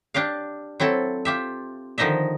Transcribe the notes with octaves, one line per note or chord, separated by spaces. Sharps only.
D4 G4 D5 F5
F#3 C4 E4 A4
F4 G4 E5
D3 D#3 F3 D#4 D#5 E5